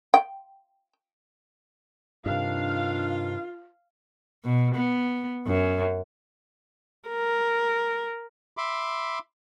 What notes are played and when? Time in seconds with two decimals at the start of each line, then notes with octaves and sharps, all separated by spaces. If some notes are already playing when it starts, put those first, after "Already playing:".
0.14 G5
2.26 G2 C3 D#3 D4 F4 F5
4.44 B2
4.75 B3
5.47 F#2
7.09 A#4
8.57 E5 B5 C6 D6